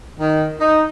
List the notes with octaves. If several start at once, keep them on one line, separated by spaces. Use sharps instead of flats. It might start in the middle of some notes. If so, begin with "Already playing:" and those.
D#3
D#4